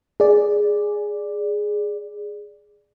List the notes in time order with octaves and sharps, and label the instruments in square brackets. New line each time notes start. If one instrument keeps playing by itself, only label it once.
[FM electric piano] G#4 D5